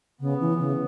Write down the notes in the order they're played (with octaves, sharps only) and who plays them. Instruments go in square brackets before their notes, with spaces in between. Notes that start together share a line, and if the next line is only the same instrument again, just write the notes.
[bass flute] C#3 [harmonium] B3
[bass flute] E3
C#3